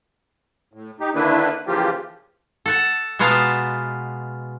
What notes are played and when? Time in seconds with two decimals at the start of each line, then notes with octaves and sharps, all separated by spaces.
0.73 A2
1.00 D#4 G4
1.15 D3 D#3 A#3 D4 E4 B4
1.67 C#3 E3 F3 A#3 F4 G4
2.66 A4 F#5 A5
3.19 B2 G#3 B3 F4 A5 A#5